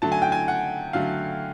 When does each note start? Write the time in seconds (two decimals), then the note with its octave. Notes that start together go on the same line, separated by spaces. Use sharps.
0.02 D3 F#3 A3 A5
0.12 G#5
0.22 G5
0.32 G#5
0.48 F#5
0.93 D3 F#3 A3 F5